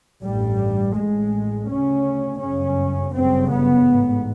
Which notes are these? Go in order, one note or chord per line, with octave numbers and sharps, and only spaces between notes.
A1 G2 G3
A1 A2 G#3
D2 C#3 C#4
G1 F#2 C#3 C#4
G1 F#2 C#3 C4
B3
A1 G#2